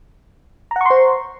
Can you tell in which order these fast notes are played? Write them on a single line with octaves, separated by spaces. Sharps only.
A#5 F#5 C#6 C6 C5